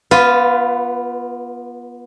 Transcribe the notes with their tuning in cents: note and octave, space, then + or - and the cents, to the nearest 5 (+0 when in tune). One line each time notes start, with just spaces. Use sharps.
B3 -30 F4 +0 B4 +10